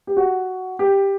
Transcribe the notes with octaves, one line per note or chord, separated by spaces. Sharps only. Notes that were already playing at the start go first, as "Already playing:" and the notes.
G4
F#4
G4